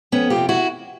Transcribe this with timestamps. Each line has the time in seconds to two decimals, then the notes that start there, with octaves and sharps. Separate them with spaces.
0.12 F2 B3 C#4
0.30 F4 G4
0.36 C3
0.49 E4 F#4